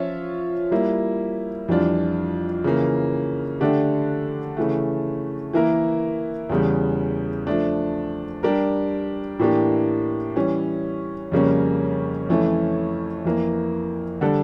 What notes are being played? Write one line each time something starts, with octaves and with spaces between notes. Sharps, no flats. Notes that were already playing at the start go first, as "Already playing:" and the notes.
Already playing: F3 C#4 F4 C#5 E5
G3 A#3 E4
F2 E3 G3 D4 F4
C#3 E3 A#3
D3 A3 D4 G4
C#3 E3 A3
E3 A#3 E4 A#4
E2 C#3 G3
F3 A3 D4
G3 D4 G4 A#4
A2 E3 A#3 D4 G4
E3 G3 C#4
F2 C#3 G3 A#3 C#4
F2 E3 A3 C#4
F2 E3 A#3
D3 G3 D4 A4